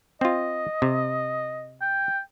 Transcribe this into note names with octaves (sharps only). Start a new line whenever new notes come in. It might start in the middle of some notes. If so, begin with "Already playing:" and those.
C4 F4 D#5
C3
G5